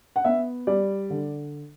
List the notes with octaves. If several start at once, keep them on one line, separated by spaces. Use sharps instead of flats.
F#5
B3 E5
G3 D5
D3